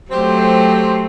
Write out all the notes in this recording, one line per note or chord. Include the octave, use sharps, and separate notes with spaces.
F#3 A3 C4 G4 C5